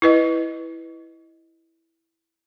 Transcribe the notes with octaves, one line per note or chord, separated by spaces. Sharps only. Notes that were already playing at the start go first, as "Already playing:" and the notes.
E4 B4 D#5